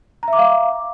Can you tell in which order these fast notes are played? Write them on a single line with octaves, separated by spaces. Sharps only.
A#5 E5 D6 F5